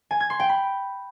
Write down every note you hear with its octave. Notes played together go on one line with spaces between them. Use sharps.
G#5
G#6
C6
G5
B5